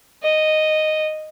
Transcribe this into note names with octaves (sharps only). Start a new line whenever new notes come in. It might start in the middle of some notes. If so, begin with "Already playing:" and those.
D#5